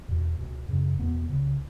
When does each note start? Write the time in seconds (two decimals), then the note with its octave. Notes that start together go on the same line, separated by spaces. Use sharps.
0.08 E2 B2
0.38 C#2 B2
0.69 F#2 C#3
0.99 E2 B2 B3
1.29 C#2 C#3